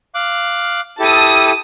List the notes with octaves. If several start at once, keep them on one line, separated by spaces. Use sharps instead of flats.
F5 D6 F#6
E4 G4 A4 A5 D#6